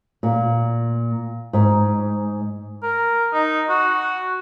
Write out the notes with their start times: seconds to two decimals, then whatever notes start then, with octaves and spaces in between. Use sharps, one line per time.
0.23 A#2
1.53 G#2
2.83 A#4
3.33 D#4
3.69 F#4